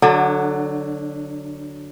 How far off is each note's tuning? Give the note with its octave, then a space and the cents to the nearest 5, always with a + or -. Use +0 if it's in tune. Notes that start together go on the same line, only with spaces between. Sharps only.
D3 +0 F#3 +0 D4 +40